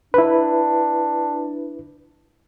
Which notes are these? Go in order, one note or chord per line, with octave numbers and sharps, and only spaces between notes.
D4 E4 B4